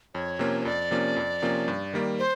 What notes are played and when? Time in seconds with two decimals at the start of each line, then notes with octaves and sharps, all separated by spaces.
0.15 F2 C#5
0.39 C3 F3 A#3 C#4
0.61 C#5
0.65 F2 D5
0.91 C3 F3 A#3 C#4
1.16 F2
1.42 C3 F3 A#3 C#4
1.68 G2
1.93 D#3 G3 A#3
2.19 C5